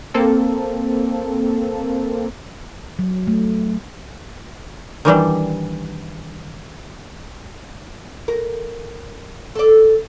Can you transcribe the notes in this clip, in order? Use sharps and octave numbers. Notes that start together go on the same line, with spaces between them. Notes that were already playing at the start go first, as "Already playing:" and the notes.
A#3 C4 A4
F#3
A3
D#3 E3 G3 D4
A#4
A4 D5